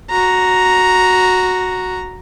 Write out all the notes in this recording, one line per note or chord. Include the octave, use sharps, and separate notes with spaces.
F#4 A#5